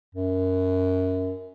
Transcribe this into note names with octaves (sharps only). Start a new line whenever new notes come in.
F#2